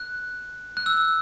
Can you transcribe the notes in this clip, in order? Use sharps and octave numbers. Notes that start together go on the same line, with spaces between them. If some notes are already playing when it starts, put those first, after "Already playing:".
Already playing: F#6
F#6
E6